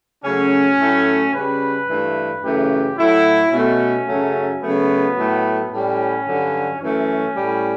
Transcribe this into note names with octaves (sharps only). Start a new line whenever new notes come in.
C#3 F#3 A3 C#4
A2 F#3 A3
C#3 G3 B4
G2 E3 A3
F#2 C#3 E3 A3 G4
A2 F#3 A3 E4
B2 A3 C#4
F#2 C#3 F#3 A3
C#3 F#3 A3 B3
A2 F#3 A3
A2 G3 C#4
G2 D3 F#3
F#2 E3 A3 C#4
A2 G3